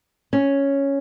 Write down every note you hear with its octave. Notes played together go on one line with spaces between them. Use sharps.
C#4